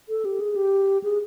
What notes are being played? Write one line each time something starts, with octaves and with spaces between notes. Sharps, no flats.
A4
G4
G#4
G4
G#4